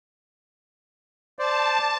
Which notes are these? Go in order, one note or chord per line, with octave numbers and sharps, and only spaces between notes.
C5 D5 A5